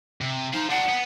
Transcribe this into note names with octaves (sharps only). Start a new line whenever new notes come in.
C3
D#4 F4 C5
D4 F#4 F#5
B3